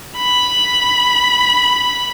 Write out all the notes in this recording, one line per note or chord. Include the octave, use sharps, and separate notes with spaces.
B5